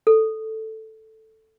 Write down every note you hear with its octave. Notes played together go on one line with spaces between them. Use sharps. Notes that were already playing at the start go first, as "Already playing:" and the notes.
A4